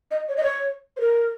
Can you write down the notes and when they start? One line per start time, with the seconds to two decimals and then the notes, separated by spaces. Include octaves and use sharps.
0.11 D#5
0.29 C#5
0.36 D#5
0.43 C#5
0.97 C5
1.00 A#4